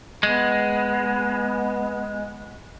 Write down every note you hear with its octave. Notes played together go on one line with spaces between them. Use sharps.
G#3 B3